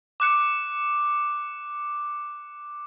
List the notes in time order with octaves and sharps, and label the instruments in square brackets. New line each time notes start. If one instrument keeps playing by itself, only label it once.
[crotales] D6 F#6 C#7